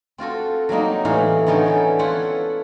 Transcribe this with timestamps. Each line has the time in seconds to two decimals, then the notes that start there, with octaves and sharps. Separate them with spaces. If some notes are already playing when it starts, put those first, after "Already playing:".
0.18 C4 F4 F#4 A4
0.69 F#3 G3 A#3 D#4
1.05 A2 E3 B4 F5
1.47 D3 D#3 B3 C#4 A4 G5
1.66 E3 A4 G5
1.99 E4 F4 A4 B4 C#5 F#5